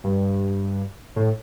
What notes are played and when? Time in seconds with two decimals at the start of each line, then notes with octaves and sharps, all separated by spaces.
0.04 G2
1.16 A2